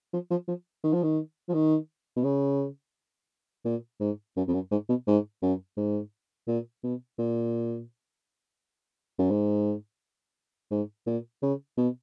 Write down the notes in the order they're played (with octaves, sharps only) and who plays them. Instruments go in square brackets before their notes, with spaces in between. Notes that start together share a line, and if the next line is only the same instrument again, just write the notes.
[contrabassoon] F3
F3
F3
D#3
F3
D#3
F3
D#3
B2
C#3
A#2
G#2
F#2
F2
F#2
G#2
B2
G#2
F#2
G#2
A#2
B2
A#2
F#2
G#2
G#2
A#2
C#3
B2